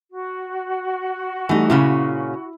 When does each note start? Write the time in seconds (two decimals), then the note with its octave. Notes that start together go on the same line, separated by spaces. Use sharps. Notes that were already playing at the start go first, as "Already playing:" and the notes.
0.12 F#4
1.49 E3 G3 A3 D#4
1.70 A#2 C#3 C#4 E4